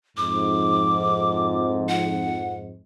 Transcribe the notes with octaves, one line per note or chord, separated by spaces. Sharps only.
F2 G#2 D6
F#5